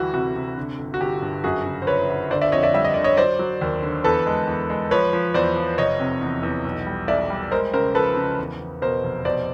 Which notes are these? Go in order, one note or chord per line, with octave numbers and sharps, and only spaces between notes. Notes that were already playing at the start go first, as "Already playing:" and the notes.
Already playing: D2 E3 G3 F#4
C3 F#4
C3
D3
G1
F#4
G1 G4
G2
F#2 F#4 G#4
C#3
C5
G1 B4 C#5
G1
D3 C5 D5
D5 E5
F2 C#5 D#5
D5 E5
G3 E5
D#5
D3 D5
C#5 D#5
F#3 C5 D5
F#3
D#2
D3
E2 A4 B4
G#3
E2
G#3
F3 B4 C#5
F3
E2 C5 D5
F3
F1 C#5 D#5
C3
E2
E2
B1
G3
B1 D5 E5
G3
G#3 A#4 C5
C#3 A#4 C5
F3 A4 B4
C#3
E2
E2
B2 A#4 C5
F1
B2 C5 D5